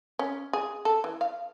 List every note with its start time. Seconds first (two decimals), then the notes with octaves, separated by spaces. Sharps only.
0.19 C#4
0.53 G#4
0.85 A4
1.04 E3
1.21 F5